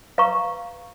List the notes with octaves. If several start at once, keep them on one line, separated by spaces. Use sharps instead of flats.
B4 F5 A#5 C#6